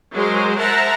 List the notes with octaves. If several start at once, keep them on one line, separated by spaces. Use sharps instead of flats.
F#3 G#3 G#4 A#4 C5 C6
A#4 C5 E5 F#5 A5 A#5